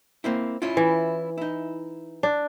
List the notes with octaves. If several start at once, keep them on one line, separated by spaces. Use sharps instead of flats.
A#3 C4 E4
C#4 E4 F4
E3
D#4 E4
D4